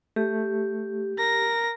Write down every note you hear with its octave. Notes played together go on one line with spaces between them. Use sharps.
A3 G4
A#4 A#6